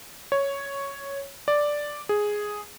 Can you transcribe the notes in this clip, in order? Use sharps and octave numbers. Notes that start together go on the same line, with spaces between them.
C#5
D5
G#4